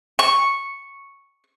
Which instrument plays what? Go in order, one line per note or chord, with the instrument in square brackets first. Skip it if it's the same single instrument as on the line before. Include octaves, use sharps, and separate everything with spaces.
[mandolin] C#6